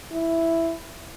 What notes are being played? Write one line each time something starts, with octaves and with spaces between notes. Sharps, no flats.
E4